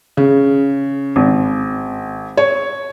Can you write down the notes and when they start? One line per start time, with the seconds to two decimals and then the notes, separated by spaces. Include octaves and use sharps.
0.17 C#3
1.16 G#1
2.37 C#5